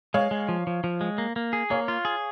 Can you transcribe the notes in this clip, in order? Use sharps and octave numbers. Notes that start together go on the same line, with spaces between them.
G#3 C#5 F5
G#3
F3
F3
F3
G#3
A#3
A#3
G#4
A#3 C#5 F5
F4
G#4